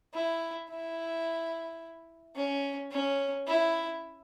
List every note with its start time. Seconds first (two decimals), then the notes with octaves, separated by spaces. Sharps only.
0.14 E4
0.70 E4
2.36 C#4
2.91 C#4
3.47 E4